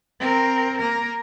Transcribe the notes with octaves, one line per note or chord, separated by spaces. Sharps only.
C4 A#4
A#3 A#4